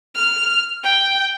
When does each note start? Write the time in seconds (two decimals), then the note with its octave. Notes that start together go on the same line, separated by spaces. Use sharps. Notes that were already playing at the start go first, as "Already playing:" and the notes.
0.15 F6
0.84 G5